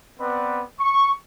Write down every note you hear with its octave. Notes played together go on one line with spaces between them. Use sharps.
B3 C4 B4 D5
C#6